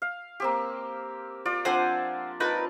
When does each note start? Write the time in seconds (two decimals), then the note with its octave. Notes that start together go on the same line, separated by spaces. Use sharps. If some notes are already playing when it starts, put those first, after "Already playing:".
0.02 F5
0.40 A#3 C4 G4
1.45 F4 D5
1.65 F3 C4 D4 C5 F#5 G#5
2.40 D#4 F4 A#4 B4 A5